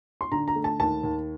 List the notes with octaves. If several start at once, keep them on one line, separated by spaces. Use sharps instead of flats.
C6
D3 A#5
A#5
A3
A5
D#2 A5
D#2